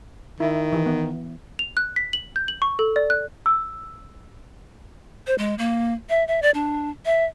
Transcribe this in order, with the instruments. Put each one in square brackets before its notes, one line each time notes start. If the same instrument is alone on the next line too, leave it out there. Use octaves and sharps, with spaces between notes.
[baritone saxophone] D#3 [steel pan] E4
[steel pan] E3
B3
[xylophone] F7
F#6
B6
F#7
G6
F#7
C#6
A4
D5
F#6
[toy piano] E6
[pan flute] C5
G#3
A#3
E5
E5
D5
D4
E5